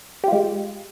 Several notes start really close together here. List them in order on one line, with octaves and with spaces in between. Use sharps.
G4 F4 G#3